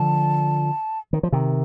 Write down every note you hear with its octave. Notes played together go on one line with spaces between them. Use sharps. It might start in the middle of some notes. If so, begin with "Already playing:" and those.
Already playing: D3 F3 A5
D#3
F3
C3 D#3